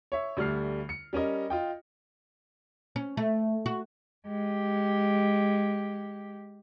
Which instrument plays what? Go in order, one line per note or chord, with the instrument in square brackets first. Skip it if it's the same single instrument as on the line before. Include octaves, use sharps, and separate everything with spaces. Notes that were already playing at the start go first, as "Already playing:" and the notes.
[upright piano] C#5 E5
D2 G3 A3 F6 C7
C#7
G3 C#4 A#4 D#5
F4 D#5 G5
[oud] C#4
A3
F#4
[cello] G#3 G4